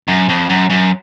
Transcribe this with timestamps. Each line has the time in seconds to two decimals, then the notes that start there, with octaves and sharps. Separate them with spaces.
0.08 F#2
0.29 F2
0.50 F#2
0.70 F#2